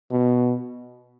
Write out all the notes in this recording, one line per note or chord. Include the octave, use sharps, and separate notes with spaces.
B2